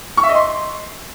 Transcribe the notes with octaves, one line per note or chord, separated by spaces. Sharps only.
C#6
E5
D#5
C6